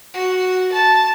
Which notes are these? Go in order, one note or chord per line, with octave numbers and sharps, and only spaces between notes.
F#4
A5